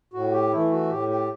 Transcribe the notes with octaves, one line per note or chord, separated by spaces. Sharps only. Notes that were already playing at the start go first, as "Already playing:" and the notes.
A2 F#4
G4
E3 A3 E4
F#4
A2 G4
G4